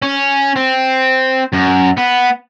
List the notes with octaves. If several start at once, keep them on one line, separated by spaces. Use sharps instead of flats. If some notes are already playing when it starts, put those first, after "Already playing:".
C#4
C4
F#2
B3